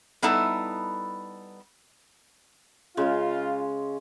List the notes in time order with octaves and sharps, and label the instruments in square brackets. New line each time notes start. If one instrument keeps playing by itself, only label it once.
[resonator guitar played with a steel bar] G3 B3 D#4 E4 A4
[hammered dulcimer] C#3 G#3 [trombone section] F4